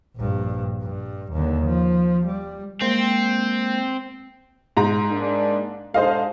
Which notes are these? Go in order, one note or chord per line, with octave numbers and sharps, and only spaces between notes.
A#1 G2
G2
D#2 D3
F3
G3
G#3 A#3 C4 C5
G#2 A#5
G#3 A#3 D4
G#2 D4 A4 C5 D#5 F5